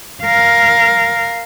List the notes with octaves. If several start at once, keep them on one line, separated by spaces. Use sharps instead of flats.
A#4 F5